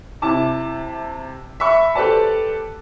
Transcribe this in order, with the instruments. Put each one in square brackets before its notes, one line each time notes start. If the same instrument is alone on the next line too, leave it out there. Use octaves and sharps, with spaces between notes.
[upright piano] C3 E4 A5 D6
E5 B5 C#6
G4 A4 B4 C5 D5 A5